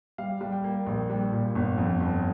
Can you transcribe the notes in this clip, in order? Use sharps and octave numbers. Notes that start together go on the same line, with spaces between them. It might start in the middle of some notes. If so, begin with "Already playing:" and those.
G3 F5
G3
G5
A#3
A#1
G3
A#2
G1
F2
G1